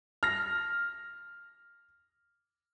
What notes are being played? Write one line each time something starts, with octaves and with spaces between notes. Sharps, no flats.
F6 A#6